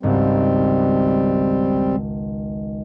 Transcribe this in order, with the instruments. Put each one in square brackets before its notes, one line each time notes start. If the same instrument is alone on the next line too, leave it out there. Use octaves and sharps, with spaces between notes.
[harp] G#1 C#2 G#2 [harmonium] G3 C4